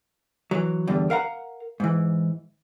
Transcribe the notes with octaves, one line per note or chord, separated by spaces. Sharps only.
E3 F#3
E2 G2 D3
A#4 F5 F#5 A#5
G#2 E3